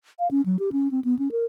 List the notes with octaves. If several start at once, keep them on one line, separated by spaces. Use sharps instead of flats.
F5
C#4
F#3
G4
C#4
C4
B3
C#4
A#4